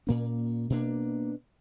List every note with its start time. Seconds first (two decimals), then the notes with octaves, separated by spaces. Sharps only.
0.07 A#2 A#3 C#4
0.70 B2 A#3 D4